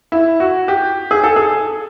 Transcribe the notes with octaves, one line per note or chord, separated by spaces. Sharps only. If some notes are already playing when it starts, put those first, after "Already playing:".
E4
F#4
G4
G#4
A4
G#4